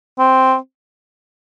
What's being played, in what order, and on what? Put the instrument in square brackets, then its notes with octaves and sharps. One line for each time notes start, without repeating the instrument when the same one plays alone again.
[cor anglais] C4